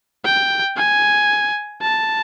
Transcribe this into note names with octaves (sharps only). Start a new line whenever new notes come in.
G5
G#5
A5